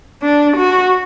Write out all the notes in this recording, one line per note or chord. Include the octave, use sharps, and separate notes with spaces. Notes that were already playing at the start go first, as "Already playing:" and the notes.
D4
F#4